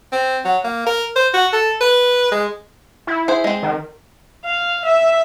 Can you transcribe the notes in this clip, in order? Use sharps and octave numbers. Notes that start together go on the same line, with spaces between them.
C4
F#3
A#3
A#4
C5
F#4
A4
B4
G#3
E4
G#4 C5
G#3 C4
D#3
F5
E5